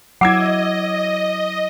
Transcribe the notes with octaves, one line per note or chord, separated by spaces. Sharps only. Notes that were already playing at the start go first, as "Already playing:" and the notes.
F#3 E4 D#5 F#5 D6 E6 G#6